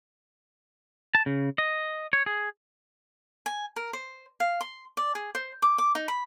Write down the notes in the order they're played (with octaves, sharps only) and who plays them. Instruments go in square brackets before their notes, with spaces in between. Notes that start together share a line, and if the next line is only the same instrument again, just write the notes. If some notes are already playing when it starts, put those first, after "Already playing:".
[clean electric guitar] A5
C#3
D#5
C#5
G#4
[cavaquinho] G#5
A#4
C5
F5
C6
D5
G#4
C5
D6
D6
D#4
B5